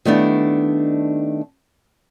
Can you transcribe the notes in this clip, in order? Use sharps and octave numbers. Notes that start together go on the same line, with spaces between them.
D#3 G3 A3 B3 D4 E4